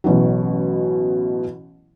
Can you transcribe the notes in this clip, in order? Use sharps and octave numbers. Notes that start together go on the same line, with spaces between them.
A1 B2 E3 F#3